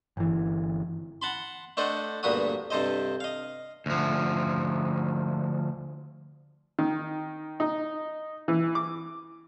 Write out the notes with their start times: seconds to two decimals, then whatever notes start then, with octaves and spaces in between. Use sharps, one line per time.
0.17 G1 E3
1.22 F#5 A5 B5 C6
1.77 A3 D4 A4 C5 D#5 F#5
2.23 D2 G2 A#2 B3 F#4 D#6
2.70 G2 C3 A4 C5 D#5
3.20 D#5 F5
3.86 D2 F3
6.79 D#3
7.60 D#4
8.48 E3
8.75 D6